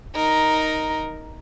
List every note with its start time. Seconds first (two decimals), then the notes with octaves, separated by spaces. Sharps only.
0.15 D#4 A#4